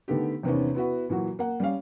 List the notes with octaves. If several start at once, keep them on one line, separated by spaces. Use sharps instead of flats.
D3 D#3 A3 B3 G4
E2 C3 D#3 B3 C#4
B3 E4 F#4 B4
A#2 E3 F#3 F#4
A#3 F#5
G3 C#4 F5